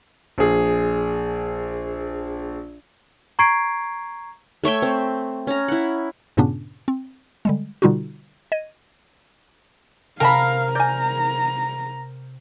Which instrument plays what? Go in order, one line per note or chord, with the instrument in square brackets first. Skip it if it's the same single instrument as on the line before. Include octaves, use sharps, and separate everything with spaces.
[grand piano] A#1 G#4
[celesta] A#5 C#6 G#6 C7 D7
[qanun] A3 C#5 E5 G5
C4
C#4 A#5
E4 F#5
[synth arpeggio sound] G2 A#2 C#3 B3 C#4 D4
C4
D3 G3 G#3
B2 D3 G3 D#4 F4 F#4
D#5 G#6 A#6 D#7
[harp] C3 [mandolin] A#4 [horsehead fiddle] F5 [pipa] G5 A5 B5
[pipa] D5 G#5 [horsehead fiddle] A#5 [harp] G6